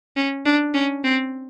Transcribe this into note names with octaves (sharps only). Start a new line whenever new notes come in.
C#4
D4
C#4
C4